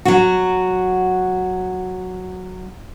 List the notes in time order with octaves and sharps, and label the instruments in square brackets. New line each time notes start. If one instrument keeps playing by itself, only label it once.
[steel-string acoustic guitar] F#3 F#4